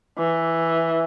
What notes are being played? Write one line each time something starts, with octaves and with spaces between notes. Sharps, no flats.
E3